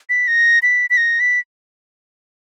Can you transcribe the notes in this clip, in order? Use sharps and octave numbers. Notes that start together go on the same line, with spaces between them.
B6
A#6
B6
B6
A#6
B6